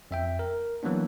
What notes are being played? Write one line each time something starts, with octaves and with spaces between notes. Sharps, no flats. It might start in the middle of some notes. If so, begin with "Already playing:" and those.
F2 E5 G5
A#4
E3 F#3 A#3 B3 D4